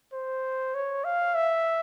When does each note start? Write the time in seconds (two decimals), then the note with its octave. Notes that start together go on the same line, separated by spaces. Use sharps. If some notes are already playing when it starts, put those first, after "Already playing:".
0.13 C5
0.74 C#5
1.04 F5
1.35 E5